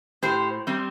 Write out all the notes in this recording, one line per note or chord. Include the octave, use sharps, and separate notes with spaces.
A2 G4 C5
G3 C4